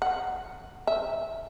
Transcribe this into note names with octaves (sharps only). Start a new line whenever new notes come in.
F#5
E5